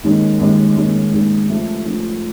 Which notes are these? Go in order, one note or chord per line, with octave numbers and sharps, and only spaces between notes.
D#2 D#3 G#3 C#4
D#2 D#3 G#3 C#4
D#2 D#3 G#3 C#4
D#2 D#3 G#3 C#4
F3 A3 C#4
F3 A3 C#4